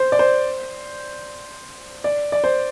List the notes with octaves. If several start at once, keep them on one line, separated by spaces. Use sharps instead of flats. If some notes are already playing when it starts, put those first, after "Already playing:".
Already playing: C5
D5
C5
D5
D5
C5